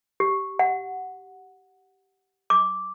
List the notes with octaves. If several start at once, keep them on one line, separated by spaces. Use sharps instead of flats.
G4
F#5
D6